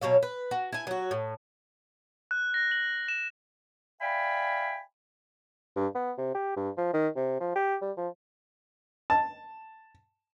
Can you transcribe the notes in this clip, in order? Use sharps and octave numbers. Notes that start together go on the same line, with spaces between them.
B2 F#3 C#5 F5
B4
F#4
E4 G#5
F#3 F#4
A2
F#6
A#6
F#7
E7
D5 E5 F5 G5 G#5 B5
G2
B3
C3
G4
G2
F3
D#3
C3
F3
G4
G3
F3
A5